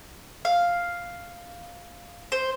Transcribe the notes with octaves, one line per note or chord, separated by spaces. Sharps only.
F5
C5